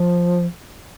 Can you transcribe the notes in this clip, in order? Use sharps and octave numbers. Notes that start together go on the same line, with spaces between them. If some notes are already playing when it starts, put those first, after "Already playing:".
Already playing: F3